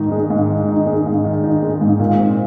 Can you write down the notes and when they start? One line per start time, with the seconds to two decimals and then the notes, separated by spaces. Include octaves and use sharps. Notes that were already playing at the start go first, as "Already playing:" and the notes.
Already playing: G#2 D#3 D#4
0.12 G#3
0.30 G#2
0.49 D#3
0.68 D#4
0.86 G#3
1.06 G#2
1.24 D#3
1.43 D#4
1.63 G#3
1.81 G#2
2.00 A#2
2.18 C4